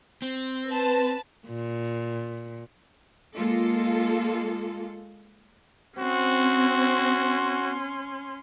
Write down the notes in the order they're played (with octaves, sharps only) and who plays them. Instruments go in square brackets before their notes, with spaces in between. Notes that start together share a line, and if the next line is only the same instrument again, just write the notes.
[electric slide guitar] C4
[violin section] B4 A5
[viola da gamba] A#2
[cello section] G#3 A#3 F4 A4
[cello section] C4 [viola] C#4 C6 [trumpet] F#4